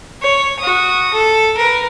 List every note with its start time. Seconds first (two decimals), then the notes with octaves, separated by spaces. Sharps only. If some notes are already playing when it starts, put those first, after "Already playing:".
0.22 C#5
0.59 F#4 D#6
1.13 A4
1.57 A#4 B4